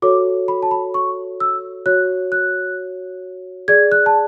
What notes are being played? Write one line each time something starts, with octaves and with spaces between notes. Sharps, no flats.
F#4 A4 C#5 D6
B5
A5
B5
C#6
E6
F#4 C#5 F#6
F#6
G#4 D5 G#6
F#6
A5